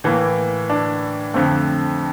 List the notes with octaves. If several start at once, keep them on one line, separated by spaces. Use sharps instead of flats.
A2 E3 A#3
D4
F2 D3 A3 C4